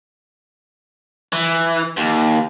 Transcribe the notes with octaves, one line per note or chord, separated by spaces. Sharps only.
E3
D#2